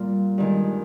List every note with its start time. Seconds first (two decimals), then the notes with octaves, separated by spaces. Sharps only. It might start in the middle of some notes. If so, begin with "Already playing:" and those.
Already playing: A#2 G3 F4
0.38 G2 D#3 G#3